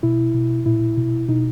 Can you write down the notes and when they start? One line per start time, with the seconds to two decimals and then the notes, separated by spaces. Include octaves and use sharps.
0.03 B2 E4
0.34 B2
0.66 A#2 E4
0.97 B2
1.28 B2 D#4